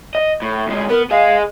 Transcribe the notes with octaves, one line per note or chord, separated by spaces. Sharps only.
D#5
A2
D2 G#3
B3 A#4
G#4 D#5 F5